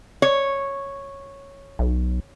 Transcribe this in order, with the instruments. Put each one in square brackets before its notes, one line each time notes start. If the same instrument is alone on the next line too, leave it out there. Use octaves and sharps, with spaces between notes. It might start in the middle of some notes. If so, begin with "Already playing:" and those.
[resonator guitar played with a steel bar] C#5
[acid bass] B1